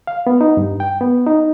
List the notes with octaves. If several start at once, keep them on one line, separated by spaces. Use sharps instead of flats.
F5
B3
D#4
G2
G5
B3
D#4